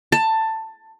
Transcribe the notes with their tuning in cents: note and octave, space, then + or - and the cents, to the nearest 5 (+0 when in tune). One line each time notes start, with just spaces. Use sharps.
A5 +15